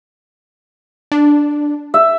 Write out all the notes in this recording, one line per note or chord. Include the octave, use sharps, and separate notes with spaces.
D4
E5